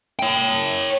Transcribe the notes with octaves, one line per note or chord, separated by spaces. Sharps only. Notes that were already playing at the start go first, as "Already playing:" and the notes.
C#5 G5